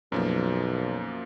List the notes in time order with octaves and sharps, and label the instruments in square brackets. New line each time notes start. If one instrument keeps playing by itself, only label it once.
[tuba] B1 [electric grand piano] F#2 F3 A#3